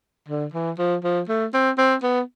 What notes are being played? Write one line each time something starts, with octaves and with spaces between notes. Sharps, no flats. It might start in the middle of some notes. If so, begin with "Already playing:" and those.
D3
E3
F3
F3
A3
C4
C4
B3